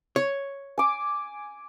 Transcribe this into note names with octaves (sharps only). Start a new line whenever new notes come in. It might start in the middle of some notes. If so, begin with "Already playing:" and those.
C#5
G#5 D6